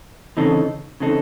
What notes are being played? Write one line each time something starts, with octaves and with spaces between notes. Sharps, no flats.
C#3 E3 C4 D#4 A4
C#3 E3 C4 D#4 A4